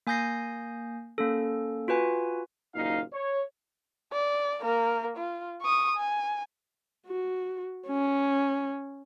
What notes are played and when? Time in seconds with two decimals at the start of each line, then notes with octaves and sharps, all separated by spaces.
0.07 A#3 G#5 D#6 G6 A#6 C7
1.18 A#3 C#4 A4
1.88 F4 F#4 B4 G#5
2.75 F#1 D#2 A#2 D#4 F5
3.13 C#5
4.12 D5
4.61 A#3 A#4
5.17 F4
5.61 C#6 D#6
5.97 G#5
7.07 F#4
7.88 C#4